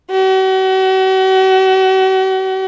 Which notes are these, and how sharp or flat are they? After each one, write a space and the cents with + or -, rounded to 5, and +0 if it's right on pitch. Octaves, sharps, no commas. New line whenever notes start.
F#4 +40